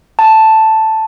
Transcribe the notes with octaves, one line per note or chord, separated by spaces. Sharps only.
A5